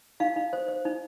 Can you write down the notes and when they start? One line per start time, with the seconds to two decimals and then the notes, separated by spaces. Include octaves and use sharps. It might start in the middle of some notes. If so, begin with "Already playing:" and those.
0.20 D#4 F5
0.36 D#4
0.53 C5
0.68 C5
0.85 D#4